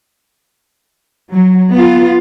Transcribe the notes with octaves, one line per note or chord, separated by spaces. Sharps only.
F#3
B3 F4